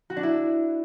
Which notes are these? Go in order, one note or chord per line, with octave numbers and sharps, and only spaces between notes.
F#4
D4
E4